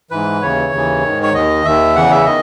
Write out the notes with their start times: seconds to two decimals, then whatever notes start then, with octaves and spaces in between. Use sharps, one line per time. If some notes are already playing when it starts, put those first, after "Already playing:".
0.11 G#2 E3 B4
0.41 D#2 C#3 E3 C#5
0.72 D#2 C#3 E3
1.02 G#2 D#3
1.23 C#5
1.34 D#2 D#3 D#5
1.65 D#2 D#3 E5
1.95 E2 C#3 E3 F#5
2.11 E5
2.26 D#3 D#5